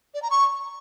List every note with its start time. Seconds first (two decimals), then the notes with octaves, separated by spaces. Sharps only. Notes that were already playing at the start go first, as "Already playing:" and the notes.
0.14 D5
0.22 A#5
0.31 C#6